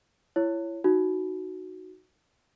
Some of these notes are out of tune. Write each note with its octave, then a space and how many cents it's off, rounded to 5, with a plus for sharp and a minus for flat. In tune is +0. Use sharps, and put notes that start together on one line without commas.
E4 +30 C#5 +0
D#4 +0 F#4 +0